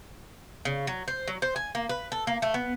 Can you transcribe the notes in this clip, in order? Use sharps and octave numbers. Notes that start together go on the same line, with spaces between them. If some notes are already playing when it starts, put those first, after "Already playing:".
C#3
F#3
C5
F#3
C5
G#5
A#3
B4
A4
A#3
A3
B3